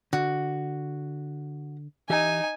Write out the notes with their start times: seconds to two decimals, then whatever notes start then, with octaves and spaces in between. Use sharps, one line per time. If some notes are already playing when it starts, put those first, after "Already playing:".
0.13 D3 F#4
2.10 E3 D#4 G4 E5 G#5